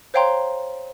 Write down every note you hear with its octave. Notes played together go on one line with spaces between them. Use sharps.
C5 C#5 F5 G5 A#5 C6